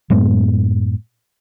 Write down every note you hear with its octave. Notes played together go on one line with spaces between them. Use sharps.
F#2 A2 G#3 B3